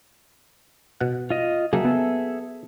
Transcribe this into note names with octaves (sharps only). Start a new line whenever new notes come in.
B2 F#5
F4 D#5
C#3 F#3 A#3 G#4 A4 E5
B3